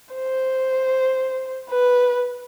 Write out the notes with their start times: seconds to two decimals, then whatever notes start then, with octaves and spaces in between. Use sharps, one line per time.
0.15 C5
1.69 B4